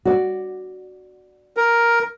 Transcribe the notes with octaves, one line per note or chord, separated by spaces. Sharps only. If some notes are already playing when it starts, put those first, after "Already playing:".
F#4 D5
A#4